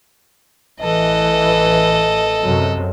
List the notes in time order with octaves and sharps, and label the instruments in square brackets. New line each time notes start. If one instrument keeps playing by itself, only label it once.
[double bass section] A1 E3 [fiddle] A4 D#5
[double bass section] F#2 C3 F#3